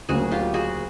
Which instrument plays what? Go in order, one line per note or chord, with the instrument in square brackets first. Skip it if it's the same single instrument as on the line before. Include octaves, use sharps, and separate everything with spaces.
[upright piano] D2 C#3 F#3 A#3 [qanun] F#4 G#4
[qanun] F4 G4
F#4 G#4